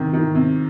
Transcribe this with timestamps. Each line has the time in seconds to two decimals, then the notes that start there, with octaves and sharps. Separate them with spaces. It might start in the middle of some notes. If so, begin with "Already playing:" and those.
Already playing: C3 D#3
0.13 D#3
0.35 C3